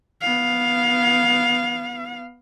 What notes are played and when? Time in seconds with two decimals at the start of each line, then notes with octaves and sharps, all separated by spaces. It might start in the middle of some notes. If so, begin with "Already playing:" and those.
0.22 B3 F5